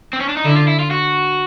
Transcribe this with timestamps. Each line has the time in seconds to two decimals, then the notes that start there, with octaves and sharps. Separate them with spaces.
0.13 C4
0.20 C#4
0.29 D4
0.37 D#4
0.45 D3 E4
0.56 F4
0.68 E4
0.79 F4
0.91 F#4